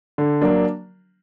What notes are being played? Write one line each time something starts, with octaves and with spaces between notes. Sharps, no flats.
D3
F#3 A#3 D4